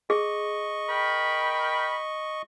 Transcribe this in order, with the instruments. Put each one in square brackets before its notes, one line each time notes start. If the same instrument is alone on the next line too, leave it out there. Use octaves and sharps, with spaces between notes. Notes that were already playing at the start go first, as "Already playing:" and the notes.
[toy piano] G#4 [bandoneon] D#5 C#6
[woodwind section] A#4 G5 B5